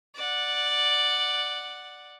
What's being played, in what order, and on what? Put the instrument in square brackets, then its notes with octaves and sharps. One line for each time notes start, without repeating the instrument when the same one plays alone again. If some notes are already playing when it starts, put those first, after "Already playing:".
[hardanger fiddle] D5 F#5